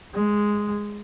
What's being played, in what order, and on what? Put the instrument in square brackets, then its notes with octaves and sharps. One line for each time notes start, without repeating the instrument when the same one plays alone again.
[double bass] G#3